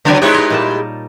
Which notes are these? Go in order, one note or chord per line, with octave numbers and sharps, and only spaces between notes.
C#3 F#3 C4 D5 G#5
G#3 D#4 E4 G4 B4 C#5
B4 D#5
A#2 G3 A5